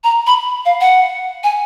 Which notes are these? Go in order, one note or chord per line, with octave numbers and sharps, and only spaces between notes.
A#5
B5
F5
F#5
G#5